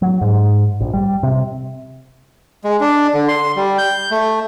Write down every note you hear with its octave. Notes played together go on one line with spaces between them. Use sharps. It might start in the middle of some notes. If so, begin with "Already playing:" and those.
F#3
G#2
A#1
G3
C3
G#3
D4
D3
C6
G3
G6
A3